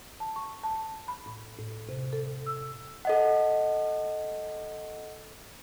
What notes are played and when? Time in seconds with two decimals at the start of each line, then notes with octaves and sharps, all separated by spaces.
0.20 A5
0.36 C#6
0.63 A5
1.08 B5
1.26 A2
1.58 A2
1.89 C3
2.13 A4
2.46 E6
3.05 A4 D#5 F#5